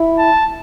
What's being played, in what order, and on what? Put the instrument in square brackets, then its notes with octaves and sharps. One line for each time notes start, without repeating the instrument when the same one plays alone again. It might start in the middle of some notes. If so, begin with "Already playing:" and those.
Already playing: [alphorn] E4
[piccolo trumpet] A5